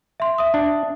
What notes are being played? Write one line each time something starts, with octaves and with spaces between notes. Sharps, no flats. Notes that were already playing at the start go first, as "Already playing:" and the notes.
E5 C6
E5 D#6
D4